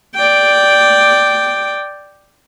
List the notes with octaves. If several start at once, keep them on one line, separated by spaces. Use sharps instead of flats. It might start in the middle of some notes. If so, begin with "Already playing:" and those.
D5 G5